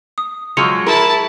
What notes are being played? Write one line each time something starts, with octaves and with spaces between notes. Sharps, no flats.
D#6
F3 F#3 G#3 C#6 E6 C#7 F7
E4 G#4 A#4 A5